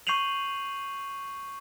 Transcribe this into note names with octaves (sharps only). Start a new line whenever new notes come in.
C#6 G6 C7 D#7 F7 F#7